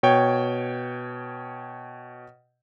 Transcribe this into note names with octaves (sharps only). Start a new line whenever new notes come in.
B2 C#5 G5